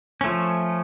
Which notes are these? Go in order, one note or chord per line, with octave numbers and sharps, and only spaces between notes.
F3 A3 C#4